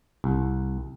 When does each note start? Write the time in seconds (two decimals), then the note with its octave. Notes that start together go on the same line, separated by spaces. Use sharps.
0.24 C2